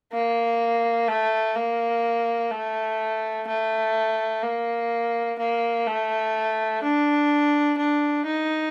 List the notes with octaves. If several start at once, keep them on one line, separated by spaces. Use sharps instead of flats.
A#3
A3
A#3
A3
A3
A#3
A#3
A3
D4
D4
D#4